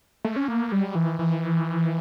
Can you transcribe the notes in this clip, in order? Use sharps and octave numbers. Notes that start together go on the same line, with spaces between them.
A3
C#4
A#3
G3
E3
E3